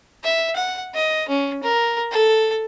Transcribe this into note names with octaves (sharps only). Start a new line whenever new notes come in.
E5
F#5
D#5
C#4
A#4
A4